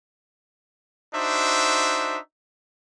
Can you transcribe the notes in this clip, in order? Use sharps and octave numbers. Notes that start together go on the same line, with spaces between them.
D4 D#4 F#4 C5 E5